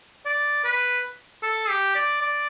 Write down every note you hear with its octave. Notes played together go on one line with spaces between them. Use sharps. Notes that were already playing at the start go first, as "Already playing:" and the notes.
D5
B4
A4
G4
D5
D5